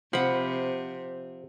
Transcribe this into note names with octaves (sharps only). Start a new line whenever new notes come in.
C3 F3 F#5 B5